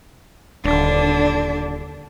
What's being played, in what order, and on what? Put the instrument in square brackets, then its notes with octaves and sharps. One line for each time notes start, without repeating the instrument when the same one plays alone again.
[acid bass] D#1 [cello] D3 D4